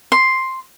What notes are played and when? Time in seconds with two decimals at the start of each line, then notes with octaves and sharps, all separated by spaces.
0.12 C6